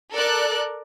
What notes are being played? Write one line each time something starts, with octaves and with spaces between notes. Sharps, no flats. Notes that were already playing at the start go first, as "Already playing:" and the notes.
A4 A#4 D5 F#6